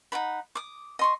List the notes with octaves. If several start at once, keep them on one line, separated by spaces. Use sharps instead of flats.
D#4 F#4 F#5 B5
D6 D#6
D#5 C6 C#6